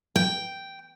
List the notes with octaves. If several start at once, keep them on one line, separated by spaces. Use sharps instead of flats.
G5